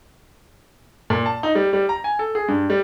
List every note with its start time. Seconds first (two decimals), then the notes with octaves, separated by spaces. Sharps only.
1.10 A#2
1.26 A5
1.43 D#4
1.55 G3
1.73 G3
1.89 A#5
2.04 G#5
2.19 A4
2.35 G#4
2.48 G2
2.70 G3